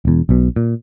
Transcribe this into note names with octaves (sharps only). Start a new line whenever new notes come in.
E1 E2
B1 B2
A#2